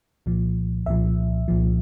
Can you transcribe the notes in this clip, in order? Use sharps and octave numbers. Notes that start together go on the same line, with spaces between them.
C2 A#2 F3
C2 A#2 F3 E5
C2 A#2 F3